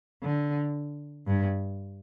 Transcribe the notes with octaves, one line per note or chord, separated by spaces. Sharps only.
D3
G2